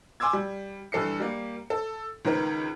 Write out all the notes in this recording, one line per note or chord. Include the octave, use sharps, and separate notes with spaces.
G#5 C6 D6 E6 G#6
G3
G2 E3 A4 C7 C#7
G3 A#3
A4
C#2 D#3 A#4 B4